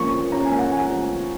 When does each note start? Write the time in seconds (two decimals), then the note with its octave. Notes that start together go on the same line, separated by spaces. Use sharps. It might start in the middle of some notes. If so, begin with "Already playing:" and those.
Already playing: F3 A#3 C#4 C#6
0.12 F3
0.32 C#4 A#5
0.45 G#5
0.51 A#3
0.59 F#5
0.71 F3 G#5
0.90 F3
1.10 C#4